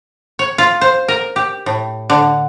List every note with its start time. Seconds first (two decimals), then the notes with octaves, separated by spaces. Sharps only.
0.39 C#5
0.58 F4
0.81 C5
1.08 A#4
1.36 G4
1.66 A2
2.10 D3